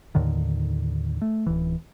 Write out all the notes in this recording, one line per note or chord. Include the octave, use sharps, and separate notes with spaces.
D#2 A2 D3 D#3
A3
D1 E3